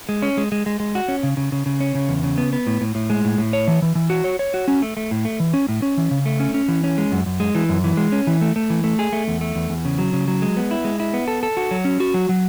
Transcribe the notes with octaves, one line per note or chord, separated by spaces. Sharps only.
G#3
C#4
G#3
G#3
G#3
G#3
F#4
C#4
C#3
C#3
C#3
C#3
C#4
C#3
E2
C#3
B3
B3
A2
A2
A2
G#3
A2
A2
C#5
E3
E3
E3
F#4
C#5
C#5
F#4
C#4
A3
A3
A2
A3
E3
C#4
A2
C#4
E3
C#3
A3
C#4
C#4
E3
C#4
G#3
F#2
F#2
G#3
E3
F#2
E3
G#3
C#4
E3
A3
A3
E3
A3
G#4
A3
E2
A3
E2
E2
C#3
F#3
C#3
F#3
G#3
B3
E4
G#3
E4
B3
A4
A4
F#4
F#3
C#4
F#4
F#3
F#3